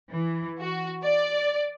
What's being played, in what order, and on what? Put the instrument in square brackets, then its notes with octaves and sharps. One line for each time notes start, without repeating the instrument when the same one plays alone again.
[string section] E3
F#4
D5